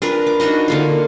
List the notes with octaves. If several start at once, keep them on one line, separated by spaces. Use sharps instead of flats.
D4 F4 A#4 B4
D6
D4 D#4 F#4 D#5
D3 A#3 F4